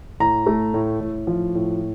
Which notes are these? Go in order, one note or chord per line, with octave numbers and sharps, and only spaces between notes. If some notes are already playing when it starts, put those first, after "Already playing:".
A2 A#5
A3
A2
A2
F3
A2